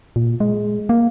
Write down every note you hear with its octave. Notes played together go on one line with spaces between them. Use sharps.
A#2
G#3
A#3